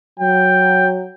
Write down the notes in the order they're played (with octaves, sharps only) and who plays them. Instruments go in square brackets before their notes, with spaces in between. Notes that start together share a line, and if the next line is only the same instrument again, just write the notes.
[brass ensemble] F#3 [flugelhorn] G5